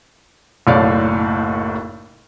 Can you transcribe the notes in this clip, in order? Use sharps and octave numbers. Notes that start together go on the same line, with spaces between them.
F#1 B1 A2 C#5 D5 F5